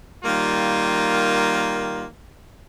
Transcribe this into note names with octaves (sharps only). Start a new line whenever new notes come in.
D#3 G3 A#3 F4